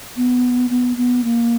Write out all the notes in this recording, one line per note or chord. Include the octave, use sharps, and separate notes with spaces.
B3
B3
B3
A#3